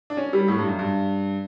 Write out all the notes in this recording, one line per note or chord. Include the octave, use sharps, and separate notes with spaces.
D4
C#4
G3
A2
G2
F#2
G2